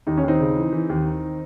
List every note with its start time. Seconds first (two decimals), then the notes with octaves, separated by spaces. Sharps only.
0.07 D#2 D#4
0.17 C#4
0.23 D#2 C4 D#4
0.40 C#3
0.56 E3
0.73 E3
0.89 D#2
1.06 D#3